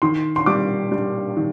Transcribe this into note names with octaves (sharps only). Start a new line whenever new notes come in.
D#3 C6
C6
G3 D6
G3
D#3